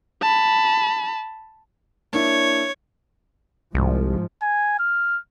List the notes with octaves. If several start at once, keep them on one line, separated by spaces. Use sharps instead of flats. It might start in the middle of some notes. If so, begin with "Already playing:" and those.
A5 B5
A#3 D4 E4 C#5
C2 G#2 F3
G#5
F6